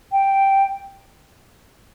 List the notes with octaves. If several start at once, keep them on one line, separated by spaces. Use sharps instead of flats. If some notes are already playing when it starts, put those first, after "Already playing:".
G5